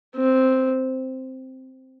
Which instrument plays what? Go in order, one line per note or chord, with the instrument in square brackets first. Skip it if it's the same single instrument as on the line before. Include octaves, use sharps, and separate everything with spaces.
[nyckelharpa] C4